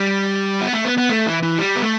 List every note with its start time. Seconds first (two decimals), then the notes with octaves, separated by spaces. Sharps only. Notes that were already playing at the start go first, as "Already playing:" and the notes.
Already playing: G3
0.61 B3
0.73 A3
0.85 B3
0.98 B3
1.10 A3
1.27 E3
1.43 E3
1.58 G3
1.76 B3
1.83 A3